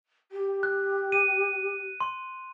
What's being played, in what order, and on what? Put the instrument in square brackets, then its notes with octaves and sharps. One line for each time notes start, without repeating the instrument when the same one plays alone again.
[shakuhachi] G4
[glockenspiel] F#6
D#7
C6